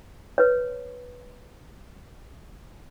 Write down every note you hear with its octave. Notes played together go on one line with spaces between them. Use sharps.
B4 C#5